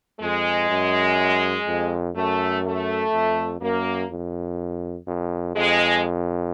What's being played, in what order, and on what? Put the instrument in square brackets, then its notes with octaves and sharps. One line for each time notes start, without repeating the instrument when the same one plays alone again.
[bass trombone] F2 [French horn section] G#3
[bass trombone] F#2
F2
[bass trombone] F#2 [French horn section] A3
[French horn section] A3
[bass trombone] F2
[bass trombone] F#2 [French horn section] A#3
[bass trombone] F2
F2
[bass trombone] F2 [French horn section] G#3